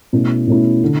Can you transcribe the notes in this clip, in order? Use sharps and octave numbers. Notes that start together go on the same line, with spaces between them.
B2 A3 C#4 E4
B2 A3 C#4 E4
D3